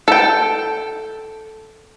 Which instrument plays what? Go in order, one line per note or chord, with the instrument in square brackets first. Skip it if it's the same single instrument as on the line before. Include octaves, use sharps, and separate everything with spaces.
[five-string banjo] A4 G5